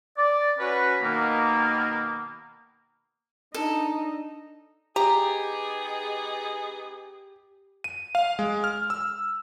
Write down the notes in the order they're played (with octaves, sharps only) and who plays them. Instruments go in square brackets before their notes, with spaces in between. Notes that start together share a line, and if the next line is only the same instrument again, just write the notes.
[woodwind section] D5
C#4 F#4 B4
B2 D#3 A#3
[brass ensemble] D4 [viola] D#4 [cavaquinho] A4
[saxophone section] B3 D#4 G#4 [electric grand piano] G4 [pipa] A#5
[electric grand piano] D#7
F5
G#3
F6
E6